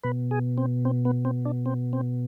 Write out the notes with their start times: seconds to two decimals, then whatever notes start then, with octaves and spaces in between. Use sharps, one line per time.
0.03 B2 B4
0.31 G#4
0.58 C4
0.85 C4
1.05 B3
1.25 C4
1.45 D4
1.66 C4
1.93 C4